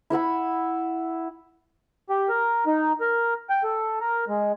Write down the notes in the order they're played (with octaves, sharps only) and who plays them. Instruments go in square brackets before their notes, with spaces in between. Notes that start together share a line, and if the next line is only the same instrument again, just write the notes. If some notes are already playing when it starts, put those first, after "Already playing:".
[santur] E4 E5 F#5 B5
[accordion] G4
A#4
D#4
A#4
G5
A4
A#4
G#3